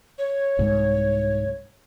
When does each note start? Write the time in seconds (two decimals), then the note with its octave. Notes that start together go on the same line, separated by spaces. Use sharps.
0.18 C#5
0.59 C2 G#2